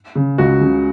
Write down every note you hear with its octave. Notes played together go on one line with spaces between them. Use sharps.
C#3
C#2 F#4
C#3